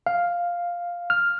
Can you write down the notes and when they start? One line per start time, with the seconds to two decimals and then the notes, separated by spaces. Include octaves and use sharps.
0.07 F5
1.10 F6